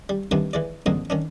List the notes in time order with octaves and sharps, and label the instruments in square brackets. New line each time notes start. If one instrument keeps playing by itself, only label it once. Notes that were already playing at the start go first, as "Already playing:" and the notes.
[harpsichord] G3
D#3 G3 A3 B3 C4 D4
E3 G#3 D5
F2 G#2 D3 A#3 C4 D#4
D#3 C#4 D4